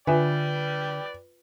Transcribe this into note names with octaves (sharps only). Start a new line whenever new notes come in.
D3 F4 B4 D5 E5 G5 G#5